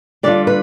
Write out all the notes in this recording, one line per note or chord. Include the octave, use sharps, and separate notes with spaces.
D3 G3 D4 F4 D5
B4